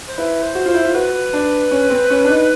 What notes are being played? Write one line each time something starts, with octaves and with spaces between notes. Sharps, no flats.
C5
E4 B4
C5
F#4
F4 C5
E4
F4
F#4 B4
D4
C#4
C4
C#4
D4
D#4